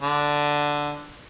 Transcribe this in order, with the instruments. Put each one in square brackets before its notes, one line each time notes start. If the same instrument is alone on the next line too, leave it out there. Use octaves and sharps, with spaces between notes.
[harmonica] D3